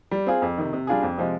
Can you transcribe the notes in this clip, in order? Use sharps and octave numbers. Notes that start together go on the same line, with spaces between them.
G3
C4 F4 G#4
F2
C3 D#3
C3
G3 D4 F4 G#4
F2
C3 F3 G#3